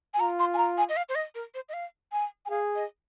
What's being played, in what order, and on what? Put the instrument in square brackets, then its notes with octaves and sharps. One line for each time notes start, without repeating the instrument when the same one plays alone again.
[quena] G#5
[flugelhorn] F4 [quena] A#5
[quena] C6
G#5
A#5
G#5
D#5
F5
C5
D#5
A#4
C5
D#5
F5
G#5
G#5
[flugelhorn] G#4 [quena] F5
[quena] D#5